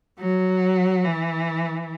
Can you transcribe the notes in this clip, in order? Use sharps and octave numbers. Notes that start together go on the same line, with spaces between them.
F#3
E3